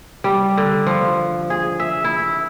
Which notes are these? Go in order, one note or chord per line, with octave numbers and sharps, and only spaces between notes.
G3
D3
F3
G#4
E5
E4